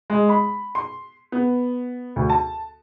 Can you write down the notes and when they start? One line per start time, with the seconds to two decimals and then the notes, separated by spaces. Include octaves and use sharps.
0.10 G#3
0.29 B5
0.75 C6
1.32 B3
2.16 D2
2.30 A5